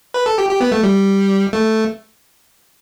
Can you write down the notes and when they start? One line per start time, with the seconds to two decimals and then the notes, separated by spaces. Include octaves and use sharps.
0.14 B4
0.26 A4
0.38 G4
0.49 G4
0.60 B3
0.72 A3
0.83 G3
1.53 A3